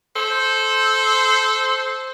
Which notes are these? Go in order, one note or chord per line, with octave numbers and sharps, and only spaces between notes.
A4 C5